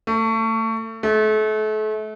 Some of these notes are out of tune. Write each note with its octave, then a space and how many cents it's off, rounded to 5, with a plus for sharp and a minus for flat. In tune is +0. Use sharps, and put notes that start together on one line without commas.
A3 +30
A3 -35